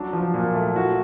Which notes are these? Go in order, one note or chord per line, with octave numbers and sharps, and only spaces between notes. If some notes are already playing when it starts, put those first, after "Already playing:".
Already playing: F#3 D4
F3
A#2
A3
F#4